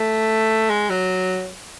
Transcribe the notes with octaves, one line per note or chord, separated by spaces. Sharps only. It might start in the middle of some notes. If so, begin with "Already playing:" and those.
Already playing: A3
G#3
F#3